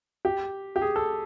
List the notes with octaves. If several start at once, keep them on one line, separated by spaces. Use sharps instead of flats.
G4
G4
G#4
A4